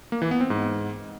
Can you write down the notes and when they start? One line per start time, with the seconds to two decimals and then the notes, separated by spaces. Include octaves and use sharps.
0.12 A#3
0.22 E3
0.31 B3
0.41 C4
0.50 G#2